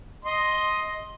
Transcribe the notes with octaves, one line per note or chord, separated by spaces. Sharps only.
D#5 C6